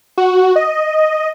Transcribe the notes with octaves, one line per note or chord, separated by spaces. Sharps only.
F#4
D#5